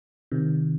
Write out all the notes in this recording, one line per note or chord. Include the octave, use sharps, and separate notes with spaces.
C3 D#3